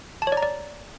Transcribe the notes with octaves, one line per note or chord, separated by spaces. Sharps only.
A5
C#5
D5
A#5
D5